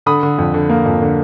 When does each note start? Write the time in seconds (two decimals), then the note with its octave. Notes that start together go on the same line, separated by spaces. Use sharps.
0.06 D3 B5 D#6
0.23 D3
0.39 F2
0.54 D3
0.69 A#3
0.86 F2
1.02 D3